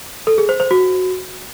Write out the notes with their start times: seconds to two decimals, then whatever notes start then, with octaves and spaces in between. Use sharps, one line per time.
0.27 A4
0.38 G#4
0.49 C5
0.60 C5
0.71 F#4